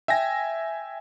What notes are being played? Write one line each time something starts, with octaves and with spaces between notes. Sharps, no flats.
E5 G5 G#5 A#6